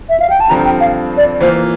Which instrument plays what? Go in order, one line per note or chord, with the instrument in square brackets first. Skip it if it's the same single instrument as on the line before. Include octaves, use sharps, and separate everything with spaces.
[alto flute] E5
F5
G5
A5
[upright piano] G2 D3 F3 C4 [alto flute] A#5
[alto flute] G5
F5
D5
[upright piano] E3 A#3 F4 [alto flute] C5